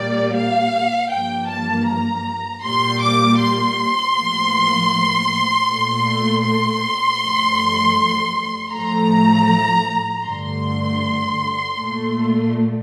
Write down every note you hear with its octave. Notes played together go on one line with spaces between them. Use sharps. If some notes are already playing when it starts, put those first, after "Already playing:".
Already playing: A#2 G3 A#3 D5
F5
G2 F3 A#3 G5
A5
A#5
A#2 G3 A#3 C6
D6
C6
A2 F3 A#3
A#2 A3
C6
G2 F3 A3
A2 F3 A3 A#5
G2 D3 A3 C6
A#2 A3